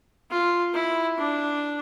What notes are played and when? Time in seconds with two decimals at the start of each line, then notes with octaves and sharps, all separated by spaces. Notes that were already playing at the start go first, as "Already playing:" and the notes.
0.30 F4
0.74 E4
1.18 D4